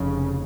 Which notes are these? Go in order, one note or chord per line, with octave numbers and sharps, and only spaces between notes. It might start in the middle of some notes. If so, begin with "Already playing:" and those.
Already playing: F1 F2 C#3